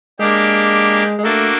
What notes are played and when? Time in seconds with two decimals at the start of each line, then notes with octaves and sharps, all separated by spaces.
0.19 G#3 A#3 D4 G4
1.19 G#3
1.23 A3 A#3 D4 F#4 A4